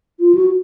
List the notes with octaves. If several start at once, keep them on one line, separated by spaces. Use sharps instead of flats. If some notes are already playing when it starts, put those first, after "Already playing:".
F4
F#4